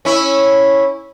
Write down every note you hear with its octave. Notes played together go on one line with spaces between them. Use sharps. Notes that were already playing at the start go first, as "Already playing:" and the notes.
C#4 E4